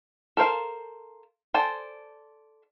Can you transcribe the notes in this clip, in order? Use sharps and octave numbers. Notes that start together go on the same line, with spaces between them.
A4 A#4 C5 F5
A4 C5 D5 G#5